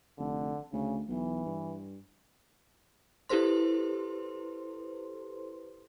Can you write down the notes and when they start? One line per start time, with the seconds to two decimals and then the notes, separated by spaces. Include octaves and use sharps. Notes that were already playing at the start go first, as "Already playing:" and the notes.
0.18 F1 D3
0.73 D2 C#3
1.08 B1 E3
1.46 G2
3.29 E4 G4 A4 B4 C5 C6